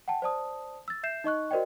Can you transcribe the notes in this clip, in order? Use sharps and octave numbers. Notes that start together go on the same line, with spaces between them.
F#5 G5 A5
C5 D5 A5 D#6
E6 A6
E5 G6 C7 E7
D#4 D#5 C#6 F#6
F#4 A#4 C5 D5 D#5 G5